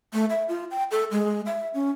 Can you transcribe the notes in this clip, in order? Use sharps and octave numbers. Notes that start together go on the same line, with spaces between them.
A3
E5
F4
G5
A4
G#3
E5
C#4